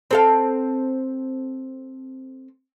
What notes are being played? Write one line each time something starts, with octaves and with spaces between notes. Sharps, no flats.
C4 A4 F5